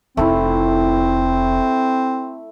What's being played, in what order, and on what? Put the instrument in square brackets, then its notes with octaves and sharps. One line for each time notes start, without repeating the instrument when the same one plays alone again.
[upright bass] F1 D#4 [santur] A3 E4 [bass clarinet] C4